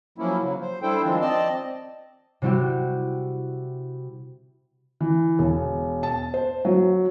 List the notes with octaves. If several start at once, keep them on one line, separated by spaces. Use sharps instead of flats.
F3 F#3 A#3 C#4 E4
C#3 F#3
C5
G3 D4 E4 A4 C5 G5
D#3 F3 G#3 C4 D4 F4
C4 D5 D#5 A5
C3 G3 E4 F#4 G4
E3
E1
A5
C5
F#3